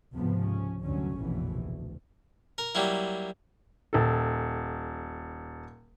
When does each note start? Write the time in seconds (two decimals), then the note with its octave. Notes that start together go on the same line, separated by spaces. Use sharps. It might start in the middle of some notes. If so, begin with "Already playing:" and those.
0.16 C#2 G#2 C3 F3 B3
0.45 C#4
0.84 F1 D2 G2 D3 F#3 C#4
1.17 F1 A#1 F2 B2 E3
1.54 D2
2.58 A#4
2.75 F#3 G3 A#3 E4
3.93 D#1 A4